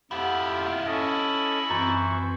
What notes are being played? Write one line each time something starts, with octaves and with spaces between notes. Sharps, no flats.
F2 E4 F4 G4 F#5
C#4 A4 D#5
F#2 E3 C4 C5 C#6